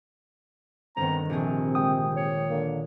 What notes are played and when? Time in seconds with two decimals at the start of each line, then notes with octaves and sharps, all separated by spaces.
0.97 G1 D#3 B3 C4 A#5
1.30 A#1 C3 C4 G#4
1.75 G#3 G5 D#6
2.16 C#5
2.48 D3 A#3